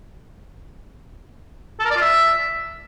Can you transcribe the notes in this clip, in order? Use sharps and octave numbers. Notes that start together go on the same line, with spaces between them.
A4
A#4
D5
F4
E5